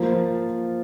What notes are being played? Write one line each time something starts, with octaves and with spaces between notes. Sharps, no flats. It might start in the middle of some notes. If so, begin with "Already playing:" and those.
Already playing: F3 A#3 F4